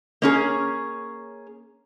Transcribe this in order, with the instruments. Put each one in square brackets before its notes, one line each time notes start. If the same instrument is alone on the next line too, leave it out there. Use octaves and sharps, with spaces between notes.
[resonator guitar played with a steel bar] A#3 C#4 G#4